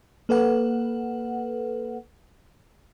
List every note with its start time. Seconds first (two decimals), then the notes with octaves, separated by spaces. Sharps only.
0.29 A#3 A4 B4 F#5